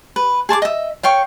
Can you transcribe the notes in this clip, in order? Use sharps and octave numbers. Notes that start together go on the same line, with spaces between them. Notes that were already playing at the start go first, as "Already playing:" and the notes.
B4
G#4 A5 C#6 D6
D#5 E5
C#5 F5 G5 C#6